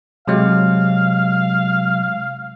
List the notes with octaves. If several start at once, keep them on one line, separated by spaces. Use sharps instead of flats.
C3 F#3 G#3 F5